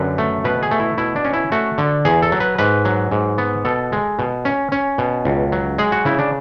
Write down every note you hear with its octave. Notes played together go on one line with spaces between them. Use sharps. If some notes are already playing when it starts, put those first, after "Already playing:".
Already playing: F#2 D3 B4
A3
B2 B4
G#4
A3
E4
B2 E4
D4
C#4
E4
A3 F#4
D3
E2 G#4
A4
F#3
B4
G#2 B4
F#3
G#2
B3
B2 A4
G#3
B2
C#4
C#4
B2
C#2
F#3
G#3 G#4
F#4
C#3 E4
D4